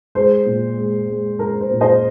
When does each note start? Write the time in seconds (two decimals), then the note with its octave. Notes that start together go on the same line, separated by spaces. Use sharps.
0.15 G#3 C5
0.46 A#2
0.77 G#3
1.08 G#3
1.39 G#3 A#4
1.60 C5
1.71 A#2
1.81 C5 D#5